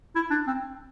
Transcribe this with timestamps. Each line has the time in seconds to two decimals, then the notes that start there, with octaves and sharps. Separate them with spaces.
0.15 E4
0.31 D4
0.47 C4